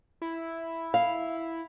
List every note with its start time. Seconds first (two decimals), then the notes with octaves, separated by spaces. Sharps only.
0.22 E4
0.94 F5